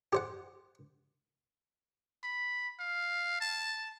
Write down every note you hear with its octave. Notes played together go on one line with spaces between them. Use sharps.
G4 C5 F#5
B5
F5
A5